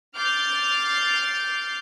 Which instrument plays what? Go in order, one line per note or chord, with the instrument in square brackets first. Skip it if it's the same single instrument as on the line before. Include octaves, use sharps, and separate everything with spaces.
[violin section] D6 F6 G6 A6 C7